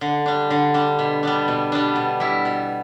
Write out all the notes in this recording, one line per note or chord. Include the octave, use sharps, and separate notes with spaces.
D3
G3 D4
D3
G3 D4
B2
G3 B3 D4
B2
G3 B3 D4
B2
G3 E4
B2